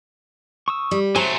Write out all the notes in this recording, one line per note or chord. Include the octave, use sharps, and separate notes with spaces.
C#6 D#6 E6
G3
F#3 A3 C5 G#5 A#5 C6